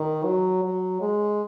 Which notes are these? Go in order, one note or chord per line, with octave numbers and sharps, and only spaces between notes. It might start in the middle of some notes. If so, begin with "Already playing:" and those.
Already playing: D#3
F#3
F#3
G#3